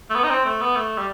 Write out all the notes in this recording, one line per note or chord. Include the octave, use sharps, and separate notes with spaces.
A3
B3
D#4
C4
A3
B3
A3
G3